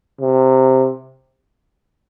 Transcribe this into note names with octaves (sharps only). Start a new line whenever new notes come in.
C3